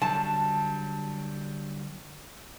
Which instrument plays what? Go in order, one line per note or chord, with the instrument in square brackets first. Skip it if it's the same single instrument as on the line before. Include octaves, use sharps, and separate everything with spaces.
[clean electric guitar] D3 F#3 G3 [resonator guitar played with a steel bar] A5